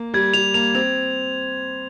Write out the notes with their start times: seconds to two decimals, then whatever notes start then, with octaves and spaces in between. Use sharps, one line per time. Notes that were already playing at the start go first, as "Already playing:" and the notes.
Already playing: A#3
0.14 G3 G#6
0.34 G3 F7
0.54 A#3 F7
0.75 C4 F7